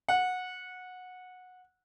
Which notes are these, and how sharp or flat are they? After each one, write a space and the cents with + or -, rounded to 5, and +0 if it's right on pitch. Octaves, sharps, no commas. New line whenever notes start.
F#5 -15